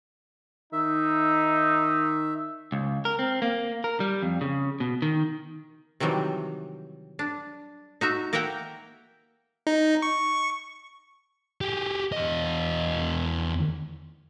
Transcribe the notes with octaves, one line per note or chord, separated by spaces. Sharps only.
D#3 D#4 E5
C#2
A#4
C4
A#3
A#4
G3
F2
C#3
B2
D#3
C3 D#3 E3 F#3 G3
D4
D#4 F#4 E5
A#3 A#4 E5 F#5 G5
D#4
C#6
G4 G#4
E2 D#5